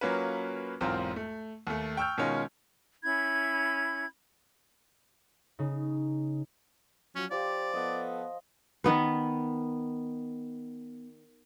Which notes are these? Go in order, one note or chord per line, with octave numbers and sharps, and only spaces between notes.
F#3 A#3 C#4 F4 B4
B1 E2 G#2 C4 F4 A#4
A3
D#2 A3
G5 C#6 E6 F6 G6
B2 D#3 G#3 C#4 F4
C#4 E4 B5 G#6
C#3 D#4
F3 F#3 C#4
F3 G4 D5
F3 B3 A4 D#5
D#3 B3 B4